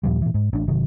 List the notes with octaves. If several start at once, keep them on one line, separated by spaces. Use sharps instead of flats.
D#2 A#2 F3 G3
A#2 E3
G#2
A1 D4
G1 C3 D#3 F#3